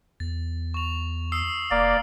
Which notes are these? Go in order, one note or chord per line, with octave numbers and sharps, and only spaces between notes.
E2 A6
C#6 F7
D#6 E6 C7
F1 A#3 D5